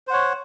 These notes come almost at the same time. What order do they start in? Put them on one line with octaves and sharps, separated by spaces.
C5 F#5 C#5